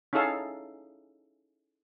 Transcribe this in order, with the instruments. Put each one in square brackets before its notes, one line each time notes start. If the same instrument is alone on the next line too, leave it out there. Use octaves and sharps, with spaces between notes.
[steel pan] C#4 D#4 E4 G#4 A4 F5